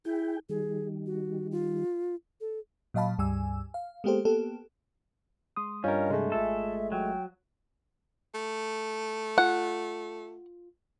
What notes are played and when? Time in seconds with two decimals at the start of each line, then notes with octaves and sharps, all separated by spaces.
0.05 E4 G#4 G5
0.49 D#3 G3 G#4
1.06 F#4
1.51 F4
2.41 A4
2.94 A#2 F#3 D#5 F5 A5 B5
3.18 C#2 G2 G3 G#5 E6
3.74 F5
4.04 G#3 A#3 B3 G4 A4 C5
4.25 A#3 B3 G4 A4
5.56 G#3 C6 D#6
5.84 G2 C#4 F4 A#4 D#5 F5
6.10 C3 G#3 A3 G#4
6.32 G#1 F4 A4 E5 G#5
6.92 F#3 G5
8.35 A3
9.38 F4 F#5